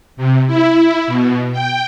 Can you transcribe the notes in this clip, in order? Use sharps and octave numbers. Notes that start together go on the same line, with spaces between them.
C3
E4
B2
G5